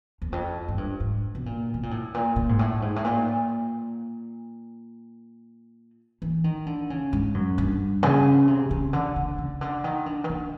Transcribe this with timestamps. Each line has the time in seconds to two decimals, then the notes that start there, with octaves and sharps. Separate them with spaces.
0.22 E2
0.32 F2
0.68 G#2
0.78 G2
1.00 G#2
1.35 B2
1.46 A#2
1.74 B2
1.83 A#2
1.91 A2
2.14 A#2
2.36 A#2
2.49 G#2
2.59 A2
2.82 G#2
2.96 A2
3.04 A#2
6.22 E3
6.44 D#3
6.66 D3
6.90 C#3
7.13 G#2
7.34 F#2
7.58 G2
8.03 C#3
8.48 C3
8.71 C#3
8.93 D3
9.16 D3
9.38 C#3
9.61 D3
9.84 D#3
10.06 D3
10.24 D#3
10.30 D3